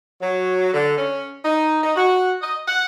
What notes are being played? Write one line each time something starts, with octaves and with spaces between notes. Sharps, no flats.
F#3
D3
C#4
D#4
D#4
F#4
D#5
F#5